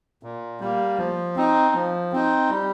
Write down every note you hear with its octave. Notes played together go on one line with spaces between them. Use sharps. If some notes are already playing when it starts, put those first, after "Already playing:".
A#2
G3 A#3
F3
C4 D#4
F3
C4 D#4
G3